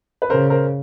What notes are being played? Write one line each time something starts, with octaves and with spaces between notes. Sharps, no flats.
B4
C#3 A#4 C5
A#4 C5